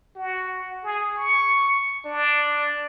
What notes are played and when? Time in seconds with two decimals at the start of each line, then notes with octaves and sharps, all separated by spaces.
0.16 F#4
0.84 G#4
1.17 C#6
2.05 D4